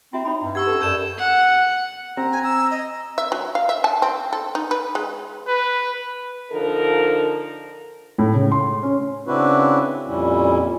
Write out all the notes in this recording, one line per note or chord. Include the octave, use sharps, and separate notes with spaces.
C4 E4 F#4 E5
D#4 C#5 B5
G2
G4 F#5 C#6 E6 G#6
C#4 A4 B4
F#2 A#4 D5 A5 G6 E7
F#5
C4 A#5
G#5
A#5 E6
D#5
E5
F#3
F5
E5
A5
C4
A4
D#4
B4
G#3
B4
D3 F3 D#4 A4 A#4
A2
C#3
C6
C#4
C#3 C4 D4 E4 F#4 B4
F2 A#2 G3 C#4 E4